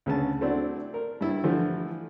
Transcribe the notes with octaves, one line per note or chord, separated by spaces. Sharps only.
D2 C#3 B4 A5
A3 C4 D4 E4 F#4
A#4
G2 E4
D3 E3 F3 G3 A3